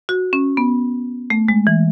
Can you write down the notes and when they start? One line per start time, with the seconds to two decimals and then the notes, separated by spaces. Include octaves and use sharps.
0.09 F#4
0.33 C#4
0.57 B3
1.30 A3
1.48 G#3
1.67 E3